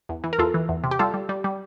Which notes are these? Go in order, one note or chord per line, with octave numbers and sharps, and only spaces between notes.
E2
E3
A#4
E2 F4 A4
E3
E2
C3
G4
G3 F4 A4
G3
G3
G3